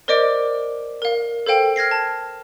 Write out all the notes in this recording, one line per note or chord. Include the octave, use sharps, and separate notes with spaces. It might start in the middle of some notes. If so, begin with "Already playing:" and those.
A#4 C5 D5 D#5 D6 D7
A#4 F5
A4 C5 F5 G5
F6 G#6 A#6 C7
A5